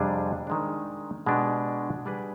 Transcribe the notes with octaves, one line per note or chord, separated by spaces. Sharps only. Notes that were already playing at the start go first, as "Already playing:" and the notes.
Already playing: F2 C3 G3 D4 G#4
D#3 G#3 D4
B2 G#3 D4 G4 B4
G3 D4 G#4 B4